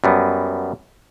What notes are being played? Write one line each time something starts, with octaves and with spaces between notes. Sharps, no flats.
F#2 G3 B3